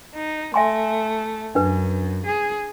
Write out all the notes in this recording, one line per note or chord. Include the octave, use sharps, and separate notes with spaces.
D#4
A3 E5 G#5 C6
F#2 D4 B4
G#4